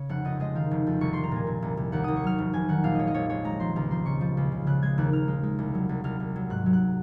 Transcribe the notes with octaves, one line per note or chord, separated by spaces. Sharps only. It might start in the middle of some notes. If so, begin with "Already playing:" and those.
Already playing: C#3 C#5
F1 F#5
F2 D#5
G#3 D#5
D#3 F5
F1
F2
C2 C#6
C2 C6
A#5
A#2 G#5
A#2
C2
C2
D#2 F#5
D#2 D#6
C#6
F#3 F6
F1
F1 G#5
D#3 F#5
A#1 F5
G#3 C#5 D#5
D#5
A#1 C#5
G#3 C#5
G#3 A#5
F3 C6
C#2 A#5
F3 C6
C#3 C#6
F3
C#2
C#3
C#3 F#6
G#3 G#6
D#2 F#6
D#2 F6
G#3
G#3
C2
F#3
C2
C2 F6
C2
F#3
G#2 F#6
F#3
F#6